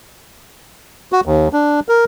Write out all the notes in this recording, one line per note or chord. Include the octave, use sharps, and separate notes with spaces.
F#4
D#2
D4
A#4